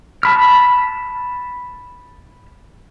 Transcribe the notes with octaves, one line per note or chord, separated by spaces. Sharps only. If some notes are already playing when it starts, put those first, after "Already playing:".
A5 B5 F6